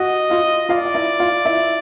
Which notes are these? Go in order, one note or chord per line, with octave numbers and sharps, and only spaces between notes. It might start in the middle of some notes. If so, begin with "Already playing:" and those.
Already playing: F#4 D#5 F#5
F4 F5
F4 D5 F5
F5
E4 E5
F4 F5
E4 E5